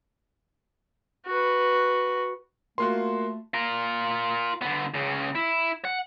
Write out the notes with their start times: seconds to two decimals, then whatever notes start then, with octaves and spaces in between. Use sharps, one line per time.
1.27 F#4 B4
2.78 A3 A#3 F4 F#4 C6
3.54 F4 A#4
4.62 D3 B3
4.94 C#2 C#3
5.35 E4
5.85 F#5